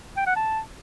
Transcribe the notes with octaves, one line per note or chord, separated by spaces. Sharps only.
G5
F#5
A5